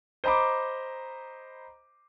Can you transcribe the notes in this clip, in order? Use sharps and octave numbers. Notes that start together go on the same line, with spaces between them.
C5 D#5 A#5 B5 D6